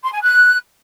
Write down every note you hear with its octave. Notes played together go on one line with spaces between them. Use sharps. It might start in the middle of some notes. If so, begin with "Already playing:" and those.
C6
G#5
F#6